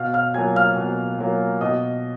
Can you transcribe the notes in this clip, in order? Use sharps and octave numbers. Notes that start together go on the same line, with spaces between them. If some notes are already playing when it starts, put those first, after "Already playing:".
Already playing: B2 F5 F6
F5 F6
F#3 A#3 F4 G#5 G#6
F5 F6
B2
F#3 A#3 F4
B2 D#5 D#6